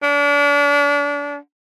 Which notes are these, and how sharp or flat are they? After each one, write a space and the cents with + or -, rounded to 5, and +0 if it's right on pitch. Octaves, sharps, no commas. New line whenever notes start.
D4 -35